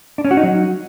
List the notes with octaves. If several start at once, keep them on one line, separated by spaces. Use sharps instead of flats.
D4
C#4
F#4
D#4
F#3